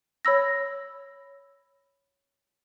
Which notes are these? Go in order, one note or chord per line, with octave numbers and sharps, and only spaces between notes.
C#5 B5 E6 A#6